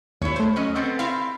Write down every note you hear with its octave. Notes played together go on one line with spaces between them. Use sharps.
D#2 E4 C#5
A3 C5
F#3 C#4 D#5
B3 C4 A4
C4 E4 F5